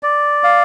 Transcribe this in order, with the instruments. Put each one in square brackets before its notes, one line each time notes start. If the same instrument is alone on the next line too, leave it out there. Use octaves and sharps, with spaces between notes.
[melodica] D5
F5